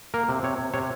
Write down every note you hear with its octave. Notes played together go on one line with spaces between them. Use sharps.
A#3 A#4
C3
C3 C#5
C3
C3 C#5